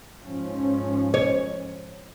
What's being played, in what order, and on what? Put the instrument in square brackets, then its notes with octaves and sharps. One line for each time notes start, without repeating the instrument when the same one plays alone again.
[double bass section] G#2 F3 C#4
[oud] C#5